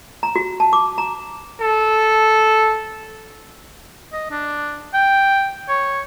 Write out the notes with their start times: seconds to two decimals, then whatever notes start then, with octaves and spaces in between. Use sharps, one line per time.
0.23 A#5
0.36 F#4
0.60 A5
0.73 D6
0.98 A#5
1.60 A4
4.13 D#5
4.31 D4
4.94 G5
5.69 C#5